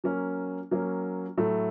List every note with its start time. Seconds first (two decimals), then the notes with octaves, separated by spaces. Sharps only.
0.04 F#3 A#3 C#4
0.71 F#3 A#3 C#4
1.37 A2 F#3 A3